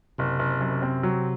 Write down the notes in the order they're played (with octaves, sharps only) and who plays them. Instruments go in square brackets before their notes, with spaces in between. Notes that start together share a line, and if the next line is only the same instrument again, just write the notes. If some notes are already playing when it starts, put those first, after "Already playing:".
[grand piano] F#1 [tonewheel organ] C3
[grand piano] F#1
F#2
C4
F#3